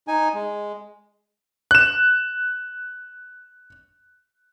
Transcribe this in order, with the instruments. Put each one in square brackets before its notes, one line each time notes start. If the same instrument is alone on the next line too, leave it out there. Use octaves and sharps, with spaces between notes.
[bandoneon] D#4 G#5
G#3
[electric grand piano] F#6 E7